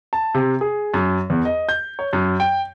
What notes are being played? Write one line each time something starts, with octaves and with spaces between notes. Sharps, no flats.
A5
C3
G#4
F#2
E2
D#5
G6
C#5
F#2
G5